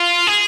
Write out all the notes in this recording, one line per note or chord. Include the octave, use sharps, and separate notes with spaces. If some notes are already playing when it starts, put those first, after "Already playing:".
Already playing: F4
G#4